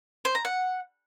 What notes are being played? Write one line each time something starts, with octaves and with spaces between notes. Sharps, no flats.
C5
A#5
F#5